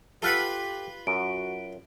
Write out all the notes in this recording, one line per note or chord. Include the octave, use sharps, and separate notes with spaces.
F4 G4 A4 B4 F5 F#5 B5
F#2 F#4 D7